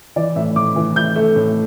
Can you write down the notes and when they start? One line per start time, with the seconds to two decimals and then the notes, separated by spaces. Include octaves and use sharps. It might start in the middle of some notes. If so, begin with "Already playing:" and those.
0.16 E3 D5
0.36 A2 E5
0.56 A2 D6
0.76 E3
0.96 A2 G6
1.16 A3
1.36 A2